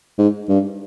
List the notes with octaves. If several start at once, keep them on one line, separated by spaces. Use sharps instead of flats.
G#2
G2